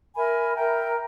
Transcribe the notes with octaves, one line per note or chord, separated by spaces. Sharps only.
A#4 E5 G#5 B5
A#4 E5 G5 A#5